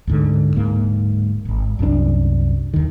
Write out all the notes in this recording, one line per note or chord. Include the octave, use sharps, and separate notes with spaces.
D2 G#2 D3
D1 G#2 A#3
D#1 G#1
C2 F#2 F3 D4
D#2 D#3